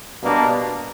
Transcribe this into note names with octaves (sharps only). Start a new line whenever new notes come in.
B2 G3 A#3 D4